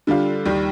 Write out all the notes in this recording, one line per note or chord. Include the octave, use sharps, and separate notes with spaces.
D3 G3 D4 F4
D#2 D#3 G3